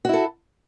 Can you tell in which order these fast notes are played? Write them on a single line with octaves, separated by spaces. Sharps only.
F#4 E4 A4